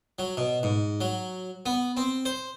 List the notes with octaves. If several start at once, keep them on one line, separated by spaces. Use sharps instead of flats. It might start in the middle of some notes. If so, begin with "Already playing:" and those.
F#3
B2
G#2
F#3
B3
C4
C5